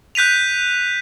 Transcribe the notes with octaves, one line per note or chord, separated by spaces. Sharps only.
F#6 G6 B6 D#7 F7